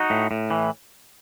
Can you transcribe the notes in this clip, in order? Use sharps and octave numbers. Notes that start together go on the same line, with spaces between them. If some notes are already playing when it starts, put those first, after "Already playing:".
Already playing: D#4 F#4
A2
A2
E3